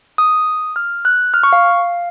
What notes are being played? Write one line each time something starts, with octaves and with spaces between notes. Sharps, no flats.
D#6
F6
F#6
F6
C#6
F5